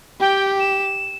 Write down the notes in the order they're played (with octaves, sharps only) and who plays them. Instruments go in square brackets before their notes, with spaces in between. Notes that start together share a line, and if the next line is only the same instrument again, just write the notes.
[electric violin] G4 [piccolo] G5
[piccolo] E7